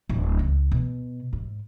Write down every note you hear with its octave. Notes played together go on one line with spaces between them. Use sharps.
D1
C#2
B2
G#2